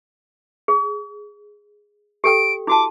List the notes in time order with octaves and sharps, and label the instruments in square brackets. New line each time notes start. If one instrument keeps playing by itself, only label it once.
[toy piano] G#4
[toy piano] G4 A4 G5 [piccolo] D7
[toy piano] E4 F#4 A5 [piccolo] D6